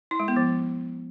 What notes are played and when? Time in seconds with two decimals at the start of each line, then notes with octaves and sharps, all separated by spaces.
0.11 E4
0.20 G#3
0.28 B3
0.37 F3